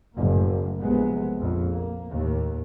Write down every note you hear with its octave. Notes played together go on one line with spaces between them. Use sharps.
F#1 A2 A#3
A#1 C3 G#3 B3
A#1 F2
A#3
D#2 A2